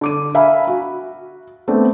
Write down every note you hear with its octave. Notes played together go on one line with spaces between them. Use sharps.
D3 D6 D#7
E5 F5 G#5 A#5 B5
F#4
A3 B3 C4 D4